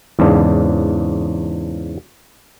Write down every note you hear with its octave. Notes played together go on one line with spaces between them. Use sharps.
E2 G#2 C#3 D4